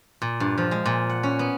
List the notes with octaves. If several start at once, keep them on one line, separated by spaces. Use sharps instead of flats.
A#2
G2
F3
G#3
A#2
F#5
C#4
B3